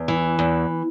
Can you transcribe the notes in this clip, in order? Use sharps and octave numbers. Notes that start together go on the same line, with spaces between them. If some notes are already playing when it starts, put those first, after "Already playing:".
Already playing: E2
E3
E2